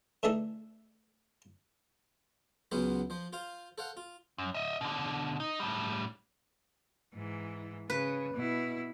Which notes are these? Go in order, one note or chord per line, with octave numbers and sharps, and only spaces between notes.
D3 E3 A3 D4 D#4 A4
C#2 F#3 B3 C#4 E4 C5
F3 C5
F4 C5 F5 C6
A4 C5 F5 F#5
F4
F#2
D#5 E5
B2 D3
D#4
A2 G3
G#2 E3
C#3 B4
B2 E4